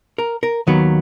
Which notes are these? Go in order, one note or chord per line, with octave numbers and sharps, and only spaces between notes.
A#4
A#4
D#2 D#3 F#3 B3 B4